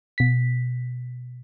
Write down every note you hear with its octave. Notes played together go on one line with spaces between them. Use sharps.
B2 B6